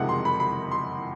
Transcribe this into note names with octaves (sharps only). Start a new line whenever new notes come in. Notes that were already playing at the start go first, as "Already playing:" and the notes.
Already playing: F#1 F2 C3 D#3 G#3 F#5
C6
B5
B5
C6